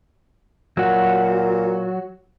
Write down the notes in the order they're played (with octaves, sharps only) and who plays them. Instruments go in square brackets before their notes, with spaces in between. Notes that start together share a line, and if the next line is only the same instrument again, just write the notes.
[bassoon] A#2 [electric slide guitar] F#3 F#4